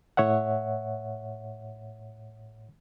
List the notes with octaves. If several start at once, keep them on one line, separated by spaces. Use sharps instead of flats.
A2 C#5 E5 F#5